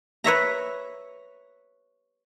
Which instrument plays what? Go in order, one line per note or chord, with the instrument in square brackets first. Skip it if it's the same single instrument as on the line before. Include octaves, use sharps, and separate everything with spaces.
[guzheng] B4 C#5 E5 A#5